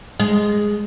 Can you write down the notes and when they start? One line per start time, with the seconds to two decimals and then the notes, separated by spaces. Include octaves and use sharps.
0.20 G#3